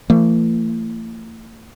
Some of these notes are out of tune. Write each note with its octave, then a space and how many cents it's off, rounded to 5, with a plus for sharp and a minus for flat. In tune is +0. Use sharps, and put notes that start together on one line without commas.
E3 +40 A3 +45